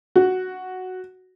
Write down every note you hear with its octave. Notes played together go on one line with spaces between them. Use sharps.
F#4